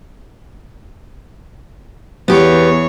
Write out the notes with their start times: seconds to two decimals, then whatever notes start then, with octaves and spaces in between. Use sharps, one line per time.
2.28 E2 B3 G4 C#5